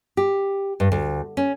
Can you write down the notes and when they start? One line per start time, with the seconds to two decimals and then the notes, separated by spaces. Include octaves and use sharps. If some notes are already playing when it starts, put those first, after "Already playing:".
0.17 G4
0.80 G2
0.92 D2
1.37 C#4